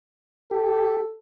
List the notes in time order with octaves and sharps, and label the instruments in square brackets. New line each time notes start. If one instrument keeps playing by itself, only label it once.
[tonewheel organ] G4 [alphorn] A4